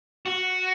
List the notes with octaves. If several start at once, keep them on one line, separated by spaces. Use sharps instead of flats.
F#4